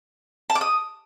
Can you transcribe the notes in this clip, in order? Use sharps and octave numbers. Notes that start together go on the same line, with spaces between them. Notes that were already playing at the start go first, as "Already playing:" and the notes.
A5
D6
D#6